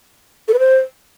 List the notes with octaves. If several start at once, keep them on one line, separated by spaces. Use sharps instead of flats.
A4
B4
C5